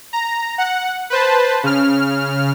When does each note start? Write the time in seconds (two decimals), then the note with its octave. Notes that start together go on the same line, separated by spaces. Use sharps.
0.13 A#5
0.58 F#5
1.10 B4 C5 A5
1.63 C#3 F6